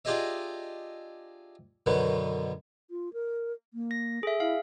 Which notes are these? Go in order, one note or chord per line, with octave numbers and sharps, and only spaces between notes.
D4 F4 G4 G#4 D#5 E5
F#2 B2 D3 D#3 B3
F4
A#4
A#3
A#6
G#4 A4 E5
E4 F5